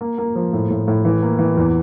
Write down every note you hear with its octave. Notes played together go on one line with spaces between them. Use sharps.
A#3
A#3
F3
A2
A2
A2
E3
A#3
E3
E2